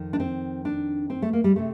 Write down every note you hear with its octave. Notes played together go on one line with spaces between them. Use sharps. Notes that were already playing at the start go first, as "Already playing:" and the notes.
Already playing: F2 D#3
D4
C4
D4
C4
A3
A#3
G3
C3 A3